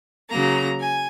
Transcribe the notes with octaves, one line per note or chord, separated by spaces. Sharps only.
C#3 F#3 A#3 A#5
G#5